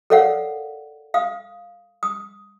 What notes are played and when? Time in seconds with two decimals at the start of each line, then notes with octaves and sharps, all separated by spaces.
0.10 A4 A#4 C#5 D5 F5 F#5
1.14 F5 D#6
2.03 D#6